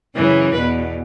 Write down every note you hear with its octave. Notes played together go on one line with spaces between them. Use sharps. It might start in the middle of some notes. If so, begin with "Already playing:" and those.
F#2 C#3 E3
E2 B2 B4